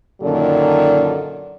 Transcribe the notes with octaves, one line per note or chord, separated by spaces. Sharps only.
F#2 A#2 D3 D#3 F#3 D4